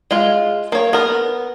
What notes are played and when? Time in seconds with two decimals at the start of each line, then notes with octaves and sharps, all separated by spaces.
0.11 G#3 F4
0.72 A#3 C#5
0.93 B3 A#4